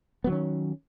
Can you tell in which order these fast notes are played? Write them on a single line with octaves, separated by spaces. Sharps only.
B3 F#3 D#3 C#4